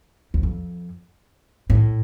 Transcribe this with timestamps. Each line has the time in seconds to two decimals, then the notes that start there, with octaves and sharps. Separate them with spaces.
0.34 E2
0.43 F2
1.70 A2